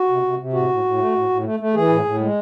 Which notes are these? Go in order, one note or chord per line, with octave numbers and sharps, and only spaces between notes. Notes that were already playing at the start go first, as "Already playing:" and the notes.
Already playing: F#4
C3
C3
C3
A2 F#4
A2
A2
A3
A2
A2
A3
A3
E3 G#4
A2
A2
G#3